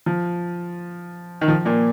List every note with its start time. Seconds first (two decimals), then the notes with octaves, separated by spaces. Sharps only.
0.06 F3
1.41 D#3
1.48 F3
1.65 A#2 A#3